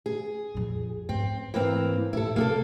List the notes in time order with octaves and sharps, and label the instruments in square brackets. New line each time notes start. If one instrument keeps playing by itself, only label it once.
[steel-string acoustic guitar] G#4
[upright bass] F2 A#2
[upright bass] G#2 [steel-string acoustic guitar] C4
[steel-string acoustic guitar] E3 A#3 C4
[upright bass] A2 [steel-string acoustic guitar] E4 A4
[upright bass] C3 [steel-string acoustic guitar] A#3 G#4 A4